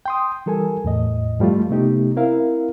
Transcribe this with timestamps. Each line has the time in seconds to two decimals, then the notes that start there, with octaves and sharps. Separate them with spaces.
0.06 G5 C6 D#6
0.46 E3 G3 A4 A#4 G#5
0.84 E2 A2 D#5
1.39 G2 F3 G3 A3 F4
1.70 C3 A3 B3 D#4 G4
2.16 C4 E4 A#4 F5